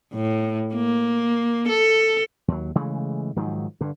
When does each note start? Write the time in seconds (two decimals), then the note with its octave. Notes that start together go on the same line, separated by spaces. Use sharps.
0.13 A2
0.74 A#3
1.68 A4
2.48 D#2 F#3
2.75 C#3 E3 G#3 A3
3.36 G#2 D#3 F3 F#3
3.81 G2 D3